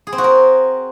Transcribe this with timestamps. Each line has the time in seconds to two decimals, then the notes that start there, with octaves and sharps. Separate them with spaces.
0.07 G#4
0.13 C4
0.18 F#4
0.24 A#4